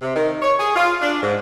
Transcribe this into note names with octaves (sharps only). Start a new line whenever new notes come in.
C3
D#3
C#5
G#4
F4
D4
G#2